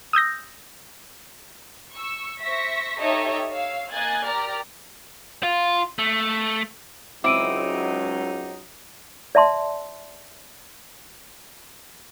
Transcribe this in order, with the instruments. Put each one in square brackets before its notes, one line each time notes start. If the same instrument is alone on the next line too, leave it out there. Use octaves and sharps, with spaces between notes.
[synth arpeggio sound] D#6 E6 G6 A#6
[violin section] C#6 E6
C5 E5 C#6 A#6 B6
D#4 G4 A4 C#5 D#5 E5
C#5 F5 E6
A#3 D#5 G#5 F#6 G#6 A6
G4 A#4 D5 A#5 F6
[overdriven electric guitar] F4
A3
[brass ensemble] C#2 F#3 D#4 [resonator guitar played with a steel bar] C4 E4 [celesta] D6 D7 D#7
[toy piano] D5 E5 A5 C6